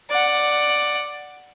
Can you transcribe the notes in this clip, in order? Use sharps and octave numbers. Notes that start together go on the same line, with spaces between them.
D5 F#5